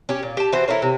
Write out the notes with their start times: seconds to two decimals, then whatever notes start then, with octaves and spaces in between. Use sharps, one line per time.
0.09 C#4 G4
0.23 A#2
0.37 G4 A5
0.52 E3 F#4 C5
0.68 E4 A4 A#4 C#5
0.82 C3